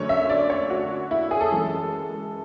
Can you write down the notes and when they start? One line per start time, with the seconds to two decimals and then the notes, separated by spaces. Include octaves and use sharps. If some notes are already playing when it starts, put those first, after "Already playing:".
Already playing: F#2 D3 F#3 A3 D4 C#5
0.09 E5
0.29 D5
0.50 C#5
0.70 F#4
1.11 E4
1.31 G#4
1.41 A4
1.51 F#2 E3 G#3